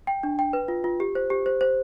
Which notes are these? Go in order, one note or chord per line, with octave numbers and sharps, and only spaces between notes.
G5
D4
G5
B4
F4
F4
G4
C5
G4
C5
C5